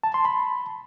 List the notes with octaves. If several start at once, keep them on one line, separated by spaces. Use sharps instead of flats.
A5
C6
B5